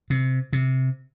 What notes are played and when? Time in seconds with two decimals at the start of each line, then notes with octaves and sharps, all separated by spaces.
0.10 C3
0.53 C3